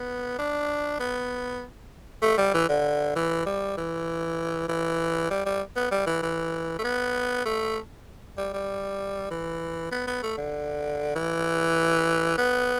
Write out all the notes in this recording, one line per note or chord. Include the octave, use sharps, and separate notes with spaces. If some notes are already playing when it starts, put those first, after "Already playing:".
Already playing: B3
D4
B3
A3
G3
E3
D3
E3
G3
E3
E3
G3
G3
B3
G3
E3
E3
A3
B3
A3
G3
G3
E3
B3
B3
A3
D3
E3
B3